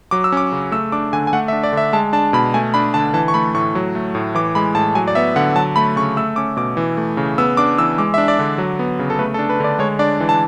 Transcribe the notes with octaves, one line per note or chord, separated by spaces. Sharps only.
F#3 D6
E6
C#4 D6
C#3
A3 E6
D4 D6
D3 G#5
G#5
A3 F#5
E5
D4
D5
D3 E5
G#3 A5
D4 A5
B2 B5
A3 G#5
D4 B5
D3 A5
E3 A5
C#6
A3 B5
A2 C#6
F#3
A3
A2
E3 D6
G#3 B5
A2 A5
F#3 G#5
D5
B3 E5
D3 F#5
F#3 A5
A3 B5
C#3 C#6
A3 E6
C#4 D6
B2 D6
E3
A3
C#3
B3 E6
D4 D6
E3 E6
G#3 D6
E5
D4
D5
D3
F#3
B3
C#3
A4
A3 B4
A4
D4
B4
D3 D5
G#3 C#5
D4 D5
E3
A5